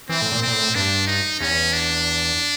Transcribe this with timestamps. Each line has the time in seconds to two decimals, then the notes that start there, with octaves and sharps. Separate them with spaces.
0.09 E3 C4
0.22 A2
0.31 A#2
0.42 A#2 C4
0.53 A2
0.75 G2 D4
1.07 D#4
1.40 E2 C#4
1.73 D4